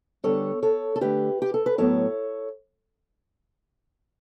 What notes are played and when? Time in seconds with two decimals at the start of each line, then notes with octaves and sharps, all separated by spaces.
0.24 D3 G3 B3 A4 C#5
0.63 A4 C#5
0.96 A4
1.01 D3 A3 G4 B4
1.42 G4
1.54 A4
1.66 B4
1.78 A2 F#3 B3 A4 C#5